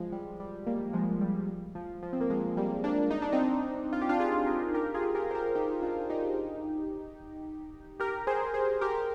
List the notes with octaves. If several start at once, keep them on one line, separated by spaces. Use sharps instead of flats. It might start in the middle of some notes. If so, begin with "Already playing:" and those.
Already playing: F3 G#3
G3
G3
G3 A#3
F3 G#3
G3
F3
F3
C4
A#3
F3 G#3
G3 A#3
A#3 D4
D#4
D4
C4 D#4
F4
G4
D4 F4
F4 G#4
G4 A#4
G4 A#4
F4 G#4
G4 A#4
C5
G4 A#4
D#4 G4
D4 F4
D#4 G4
G4 A#4
G#4 C5
G#4 C5
G4 A#4